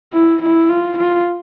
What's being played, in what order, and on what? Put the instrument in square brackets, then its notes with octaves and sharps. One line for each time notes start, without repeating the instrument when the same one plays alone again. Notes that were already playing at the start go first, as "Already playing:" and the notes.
[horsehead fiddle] E4
E4
F4
F4